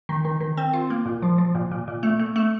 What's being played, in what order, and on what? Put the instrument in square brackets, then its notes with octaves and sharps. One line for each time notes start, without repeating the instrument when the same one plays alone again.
[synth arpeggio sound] D#3
D#3
D#3
C4
F4
A#3
A#2
F3
F3
A#2
A#2
A#2
A3
A3
A3